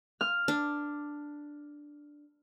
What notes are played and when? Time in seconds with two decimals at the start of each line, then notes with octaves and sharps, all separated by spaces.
0.21 F6
0.48 D4